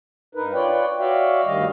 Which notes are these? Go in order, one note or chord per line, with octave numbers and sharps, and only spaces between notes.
G2 D#4 A#4 B4
F4 B4 C#5 D5 G5
F#4 C#5 D5 E5 F5 G5
D2 G2 D#3 G3 D#5 F5